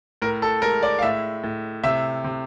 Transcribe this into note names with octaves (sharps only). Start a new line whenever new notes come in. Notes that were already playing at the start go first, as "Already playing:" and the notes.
A2 A#4
A4
G#3 A#4
D5
F5
A2 E5
A2
C3 E5
C3